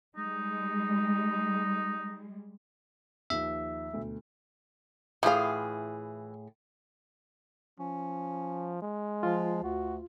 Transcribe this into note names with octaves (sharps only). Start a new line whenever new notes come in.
G3 G#3 D#4
D#2 D#3 F3 E5
D2 B2 A3
A2 E3 F4 G#4 F5
F3 C#4
G#3
F3 F4
D2 F#4